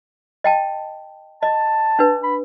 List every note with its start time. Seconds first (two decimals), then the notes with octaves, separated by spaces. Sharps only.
0.44 D#5 G5 A5
1.43 D#5 A5
1.99 D4 B4
2.24 B5